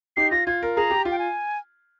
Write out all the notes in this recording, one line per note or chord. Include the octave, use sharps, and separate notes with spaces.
D#4 G4 C7
F4 A#6
F4 G#6
A#4
G#4 A#5
G4
F4
G5
G#5